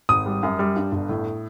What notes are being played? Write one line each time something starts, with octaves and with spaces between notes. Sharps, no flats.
G#1 D#6
G3
F#2
G3
G2
G1
A2